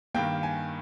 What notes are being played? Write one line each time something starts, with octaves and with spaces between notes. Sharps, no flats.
G2 D#3 A#3 G5
G#5